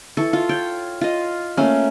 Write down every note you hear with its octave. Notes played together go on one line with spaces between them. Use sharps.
E3 A4 C#6
F4
C#5 G5
F4 D#5
A3 A#3 C#4